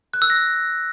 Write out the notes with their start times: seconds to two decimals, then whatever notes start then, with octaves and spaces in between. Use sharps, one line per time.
0.14 F#6
0.22 E6
0.30 A#6